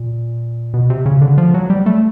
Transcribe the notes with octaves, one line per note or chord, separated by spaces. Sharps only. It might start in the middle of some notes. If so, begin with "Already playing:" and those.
Already playing: A#2
B2
C3
C#3
D3
F3
F#3
G3
A3